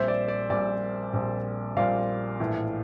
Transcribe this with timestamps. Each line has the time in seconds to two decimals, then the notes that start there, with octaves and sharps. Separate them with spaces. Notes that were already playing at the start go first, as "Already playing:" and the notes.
Already playing: A#1 A#2 G3 C4 C5 E5
0.08 D5
0.28 D5
0.50 A#1 A#2 G3 C4 D5
1.13 A#1 A#2 G3 C4
1.76 A#1 A#2 G3 C4 D5 F5
2.40 A#1 A2 E3